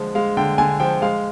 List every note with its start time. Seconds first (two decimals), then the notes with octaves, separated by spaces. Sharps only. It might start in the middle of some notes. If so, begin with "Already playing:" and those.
Already playing: D3 F3 G#3
0.15 G#3 F5
0.37 D3 G5
0.58 D3 G#5
0.80 F3 G5
1.02 G#3 F5